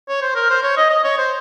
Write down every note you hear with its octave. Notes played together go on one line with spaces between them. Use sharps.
C#5
C5
A#4
C5
C#5
D#5
D#5
C#5
C5